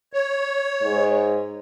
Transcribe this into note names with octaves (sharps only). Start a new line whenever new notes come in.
C#5
G#2